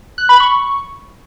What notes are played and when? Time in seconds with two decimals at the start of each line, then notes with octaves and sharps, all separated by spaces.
0.18 F#6
0.29 B5
0.40 C#6